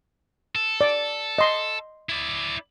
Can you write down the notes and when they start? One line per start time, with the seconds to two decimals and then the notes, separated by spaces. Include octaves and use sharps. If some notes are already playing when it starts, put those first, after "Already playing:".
0.55 A4
0.81 D5
1.38 D#5 C6
2.09 E4 D5